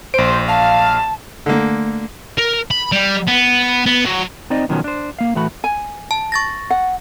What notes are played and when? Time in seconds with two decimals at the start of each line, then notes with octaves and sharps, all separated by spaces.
0.14 A#1 C5 D7
0.48 F5 A5
1.46 D3 A3 A#3
2.38 A#4
2.71 B5
2.92 G3
3.27 B3
3.86 B3
4.05 F#3
4.50 C4 D#4 C5 D5 D#5
4.69 B2 D#3 F3 F#3 C#4
4.84 D4 C5
5.19 A#3 F5
5.35 A2 E3 A3 F#4 B5
5.64 G#5
6.11 A5
6.32 C#6 A6 A#6
6.70 F#5